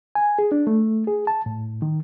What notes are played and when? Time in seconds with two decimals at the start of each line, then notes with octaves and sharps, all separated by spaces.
0.15 G#5
0.39 G#4
0.52 D4
0.67 A3
1.07 G#4
1.27 A5
1.46 A2
1.82 D#3